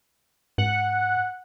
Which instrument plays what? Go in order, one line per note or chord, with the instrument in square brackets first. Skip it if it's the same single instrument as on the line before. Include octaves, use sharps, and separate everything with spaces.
[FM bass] G#2 [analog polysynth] F#5